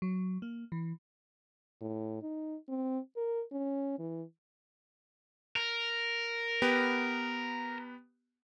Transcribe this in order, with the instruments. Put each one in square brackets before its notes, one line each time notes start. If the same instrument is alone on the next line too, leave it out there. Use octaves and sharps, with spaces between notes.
[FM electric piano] F#3
A#3
E3
[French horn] A2
D#4
C4
A#4
C#4
E3
[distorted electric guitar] A#4
[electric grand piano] B3 G4 B4